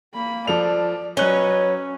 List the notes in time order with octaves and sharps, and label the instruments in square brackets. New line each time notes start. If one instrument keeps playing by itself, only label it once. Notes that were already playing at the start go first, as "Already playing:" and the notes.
[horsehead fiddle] A#3 B5
[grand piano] F3 A4 F7 [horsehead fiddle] D5
[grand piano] F#3 F#6 G7 [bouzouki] C#4 [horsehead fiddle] B4 D#5 [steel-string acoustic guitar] C#5